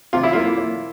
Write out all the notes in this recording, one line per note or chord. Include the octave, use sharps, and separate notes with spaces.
C3 F4
E4
A#3 F4
A#3